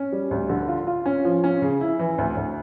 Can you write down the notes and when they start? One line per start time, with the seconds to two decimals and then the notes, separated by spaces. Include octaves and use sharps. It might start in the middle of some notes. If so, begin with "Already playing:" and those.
Already playing: C#4
0.12 G3
0.31 D2
0.49 D3
0.68 F4
0.87 F4
1.06 C#4
1.25 F3
1.44 C#4
1.62 C#3
1.81 E4
1.99 E3
2.18 D2
2.37 D2